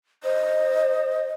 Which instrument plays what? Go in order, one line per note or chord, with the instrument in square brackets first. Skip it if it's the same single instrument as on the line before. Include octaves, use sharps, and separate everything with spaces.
[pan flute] C5 [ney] D#5